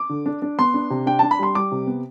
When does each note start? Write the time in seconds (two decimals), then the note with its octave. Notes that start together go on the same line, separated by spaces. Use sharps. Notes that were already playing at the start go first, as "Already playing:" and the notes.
Already playing: D6
0.09 D3
0.26 D4
0.42 D4
0.59 B3 C6
0.74 D4
0.90 C3
1.06 D4 G5
1.19 D4 A5
1.31 B5
1.39 G3 C6
1.55 G3 D6
1.72 C3
1.87 B3